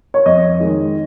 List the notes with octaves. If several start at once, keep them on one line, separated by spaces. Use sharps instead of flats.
C#5
F2 D#5
D#3 G#3